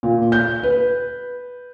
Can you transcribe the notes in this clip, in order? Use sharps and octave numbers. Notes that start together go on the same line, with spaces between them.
A#2
G6
B4